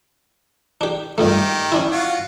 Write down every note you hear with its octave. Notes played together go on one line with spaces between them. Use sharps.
D4 G4
G2 A#2 D#3 A3 G4
C#4 D4 E4
F4 F#4